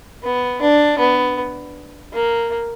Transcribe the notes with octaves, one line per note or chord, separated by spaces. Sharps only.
B3
D4
B3
A#3